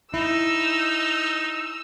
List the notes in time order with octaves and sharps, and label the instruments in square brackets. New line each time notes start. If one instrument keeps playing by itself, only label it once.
[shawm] D#4 [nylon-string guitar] E4 [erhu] E6